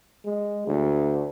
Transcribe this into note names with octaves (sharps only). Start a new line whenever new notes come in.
G#3
D2